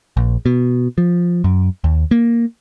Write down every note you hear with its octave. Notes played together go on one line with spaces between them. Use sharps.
A#1
B2
F3
F#2
D#2
A#3